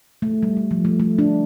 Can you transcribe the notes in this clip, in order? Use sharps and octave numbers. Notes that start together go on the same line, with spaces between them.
A3
G3
G3
F3
A3
A3
D4